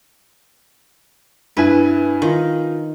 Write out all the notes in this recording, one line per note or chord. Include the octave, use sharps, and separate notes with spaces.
G2 E4 B4 G#5
D#3 D#4 F4